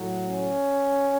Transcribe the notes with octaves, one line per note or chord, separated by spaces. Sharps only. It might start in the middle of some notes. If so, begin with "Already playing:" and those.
Already playing: A2 F#3
C#4